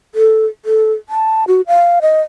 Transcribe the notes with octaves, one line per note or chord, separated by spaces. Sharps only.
A4
A4
A5
F#4
F5
D#5